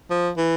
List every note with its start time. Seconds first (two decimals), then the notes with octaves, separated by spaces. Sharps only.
0.10 F3
0.37 E3